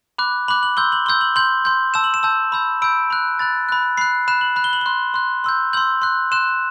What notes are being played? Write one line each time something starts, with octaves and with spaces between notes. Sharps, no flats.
B5 D6 F#6
B5 D6 F#6 F#7
F#7
C6 E6 G6 G7
F#7
C6 E6 G6 G7
F#7
C6 G6 F#7
C6 G6
A5 E6 G6 E7
F#7
E7
A5 E6 G6
B5 E6 G6
B5 E6 G6 D7
B5 F#6
B5 F#6 A6
B5 F#6
B5 F#6 C7
B5 F#6 E7
F#7
B5 F#6
G7
F#7
C6 F#6 G7
C6 F#6
C6 E6 G6
C6 E6 G6 F#7
C6 F#6
C6 F#6 E7